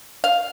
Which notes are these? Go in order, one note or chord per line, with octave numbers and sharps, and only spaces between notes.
F5